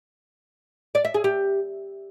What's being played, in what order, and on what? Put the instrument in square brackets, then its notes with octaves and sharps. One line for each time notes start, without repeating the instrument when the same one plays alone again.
[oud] D5
E5
G#4
G4